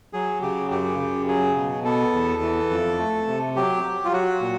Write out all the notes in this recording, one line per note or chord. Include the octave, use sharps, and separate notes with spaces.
F#3 G#4
C#3 G4
F#2 G4
C#3
F#3 G#4
B2
B3 A4
E2
E3
F2
A3
C3
F#3 G4
F#3
F4
F#3 F#4
A#2